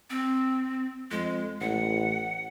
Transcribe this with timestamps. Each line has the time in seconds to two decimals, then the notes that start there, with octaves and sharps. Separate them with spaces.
0.10 C4
1.11 F2 G#3
1.61 A1 F#5